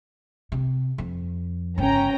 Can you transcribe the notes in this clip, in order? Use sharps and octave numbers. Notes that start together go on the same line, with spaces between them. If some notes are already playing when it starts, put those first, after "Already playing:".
C3
F2
G1 C#3 C#4 G5 A#5